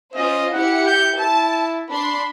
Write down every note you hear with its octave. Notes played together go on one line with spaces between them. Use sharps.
C#4 F4 C5 D#5
E4 G4 F#5 C#7
G6
E4 A5
D4 B5 C6